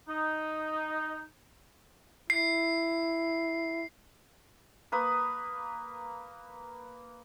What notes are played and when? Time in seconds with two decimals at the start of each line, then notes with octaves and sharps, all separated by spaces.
0.08 D#4
2.30 E4 C7
4.92 A#3 B4 D#6